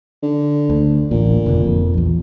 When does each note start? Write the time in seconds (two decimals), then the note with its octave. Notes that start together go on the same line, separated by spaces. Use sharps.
0.22 D3
0.70 D2
1.11 A1 A#2
1.46 F1 B2 D3
1.64 F2
1.94 A#1 E2